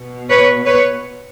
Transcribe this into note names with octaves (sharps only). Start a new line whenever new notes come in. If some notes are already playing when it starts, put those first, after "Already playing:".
Already playing: B2
B4 C#5
B4 C#5